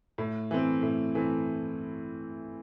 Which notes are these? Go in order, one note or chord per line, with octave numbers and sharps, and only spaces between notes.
A2
E3 A3 C4
A2
E3 A3 C4